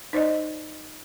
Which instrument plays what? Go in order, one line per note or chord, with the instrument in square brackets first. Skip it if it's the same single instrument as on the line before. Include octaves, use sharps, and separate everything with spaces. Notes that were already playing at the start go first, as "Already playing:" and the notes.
[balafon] D#4 C5 D5 D#5